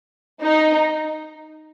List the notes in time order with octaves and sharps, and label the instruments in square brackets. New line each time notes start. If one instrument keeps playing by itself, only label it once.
[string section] D#4